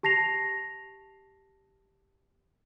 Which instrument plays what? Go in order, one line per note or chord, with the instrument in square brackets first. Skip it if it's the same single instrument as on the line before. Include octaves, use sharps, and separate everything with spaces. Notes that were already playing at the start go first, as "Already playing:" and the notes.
[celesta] G4 A5 A#6 C7 F7